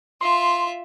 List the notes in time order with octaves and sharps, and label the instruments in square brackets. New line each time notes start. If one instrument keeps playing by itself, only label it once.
[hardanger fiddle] F4 E5 [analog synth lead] C6